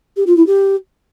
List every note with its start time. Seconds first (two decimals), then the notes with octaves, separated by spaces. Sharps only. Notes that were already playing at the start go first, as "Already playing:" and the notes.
0.16 G4
0.26 F4
0.36 E4
0.46 G4